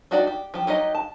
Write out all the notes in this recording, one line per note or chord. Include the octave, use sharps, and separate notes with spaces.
D4 D#4 F#4 G4 D5
G4
F3 G4
F#3 D#4 G4 D#5
A5